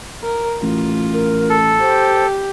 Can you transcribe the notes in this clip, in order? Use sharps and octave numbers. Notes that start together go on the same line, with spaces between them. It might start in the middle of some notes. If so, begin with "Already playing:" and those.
A#4
A1 F4
A#4
A4
G4 C5